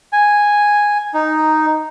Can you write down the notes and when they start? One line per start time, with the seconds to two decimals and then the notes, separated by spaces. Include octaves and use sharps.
0.13 G#5
1.14 D#4